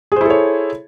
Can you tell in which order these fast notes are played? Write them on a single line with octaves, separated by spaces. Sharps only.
G#4 C5 E4 A4 C#5